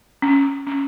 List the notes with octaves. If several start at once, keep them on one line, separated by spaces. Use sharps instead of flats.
C#4
C#4